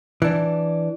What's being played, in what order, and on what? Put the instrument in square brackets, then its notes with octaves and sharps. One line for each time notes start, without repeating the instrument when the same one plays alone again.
[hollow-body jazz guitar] E3 D4